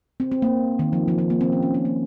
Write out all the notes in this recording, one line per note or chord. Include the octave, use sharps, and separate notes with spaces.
C4
C4
A#3
D#3
F3
F3
F3
A#3
C4
C#4
C#4
C4
A#3